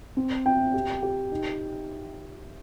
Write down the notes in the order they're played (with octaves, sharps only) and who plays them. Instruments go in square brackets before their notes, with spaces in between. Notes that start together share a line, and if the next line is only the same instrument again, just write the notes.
[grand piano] C4
[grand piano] C4 [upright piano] G5
[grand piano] G4
G4
D#4